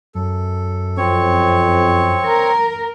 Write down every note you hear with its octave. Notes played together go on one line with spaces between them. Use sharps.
F#2 A4
F2 C4 C#5 C#6
A#4